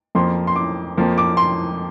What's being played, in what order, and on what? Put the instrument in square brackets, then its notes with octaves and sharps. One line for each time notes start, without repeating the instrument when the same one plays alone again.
[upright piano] F2 F3 A#3 C6
C6
D6
F2 F3 A#3
D6
C6